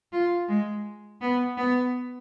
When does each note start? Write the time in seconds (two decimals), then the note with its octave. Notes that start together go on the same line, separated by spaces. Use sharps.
0.12 F4
0.49 G#3
1.21 B3
1.57 B3